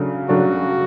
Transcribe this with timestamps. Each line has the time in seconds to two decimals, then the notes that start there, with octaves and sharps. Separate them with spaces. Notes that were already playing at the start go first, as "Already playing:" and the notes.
Already playing: C#3 F#3 A3 D4
0.29 C#3 F#3 A3 D4 F#4